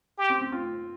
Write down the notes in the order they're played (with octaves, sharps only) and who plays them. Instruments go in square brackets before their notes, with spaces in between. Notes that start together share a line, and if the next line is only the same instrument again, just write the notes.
[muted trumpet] G4
[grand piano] C4
C4
C4 F4